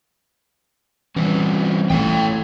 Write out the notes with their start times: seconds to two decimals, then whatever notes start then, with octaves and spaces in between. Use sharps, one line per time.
1.16 E3 G3 C4 C#4
1.90 A1 A4 C#5 G5